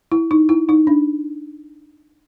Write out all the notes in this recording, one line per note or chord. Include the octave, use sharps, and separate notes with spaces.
E4
D#4
E4
D#4
D4